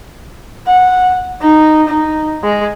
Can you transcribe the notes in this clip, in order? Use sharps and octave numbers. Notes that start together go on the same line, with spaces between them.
F#5
D#4
D#4
G#3